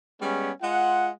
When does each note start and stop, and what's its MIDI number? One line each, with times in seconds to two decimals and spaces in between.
0.21 0.51 55
0.21 0.51 56
0.21 0.51 59
0.21 0.51 61
0.62 1.10 56
0.62 1.10 65
0.62 1.10 78